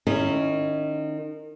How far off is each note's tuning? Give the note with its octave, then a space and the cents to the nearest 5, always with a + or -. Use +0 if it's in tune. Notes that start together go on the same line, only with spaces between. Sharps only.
D#3 -25 C#4 +0 E4 -5